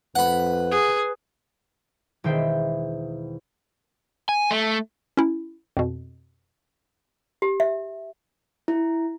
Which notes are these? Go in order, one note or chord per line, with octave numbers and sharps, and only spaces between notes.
F2 B4 F#5 B5
G#4
E1 D#3 C5 E5 G5
G#5
A3
C#4 E4
F2 B2
G4
E5
E4